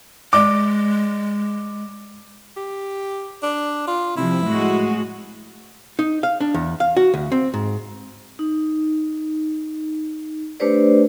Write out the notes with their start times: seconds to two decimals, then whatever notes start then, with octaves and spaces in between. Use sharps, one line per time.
0.33 G#3 D5 D6
2.57 G4
3.43 D4
3.87 F4
4.17 C3 F3 E4
4.46 A2 G#3 F#4
5.99 D#4
6.23 F5
6.41 D4
6.54 E2
6.80 F5
6.97 F#4
7.14 D2
7.32 C4
7.54 G#2
8.39 D#4
10.60 A3 D4 G4 B4 C5 D5